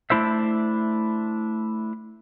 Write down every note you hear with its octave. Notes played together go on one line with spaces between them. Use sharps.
A3 D4 E4 C5 E5